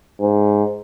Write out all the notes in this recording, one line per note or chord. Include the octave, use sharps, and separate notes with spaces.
G#2